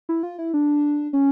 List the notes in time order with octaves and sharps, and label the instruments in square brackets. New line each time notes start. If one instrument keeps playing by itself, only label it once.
[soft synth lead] E4
F4
E4
D4
C#4